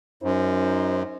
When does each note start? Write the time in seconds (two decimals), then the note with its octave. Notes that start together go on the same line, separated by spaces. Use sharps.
0.23 F#2 D#4 C5